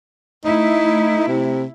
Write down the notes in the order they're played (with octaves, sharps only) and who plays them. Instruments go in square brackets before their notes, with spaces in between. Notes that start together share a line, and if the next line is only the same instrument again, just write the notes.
[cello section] A3 E4 [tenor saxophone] D#4
[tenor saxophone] C3